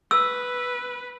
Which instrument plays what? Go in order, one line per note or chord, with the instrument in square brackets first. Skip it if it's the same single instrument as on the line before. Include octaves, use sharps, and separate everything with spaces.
[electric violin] B4 [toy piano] E6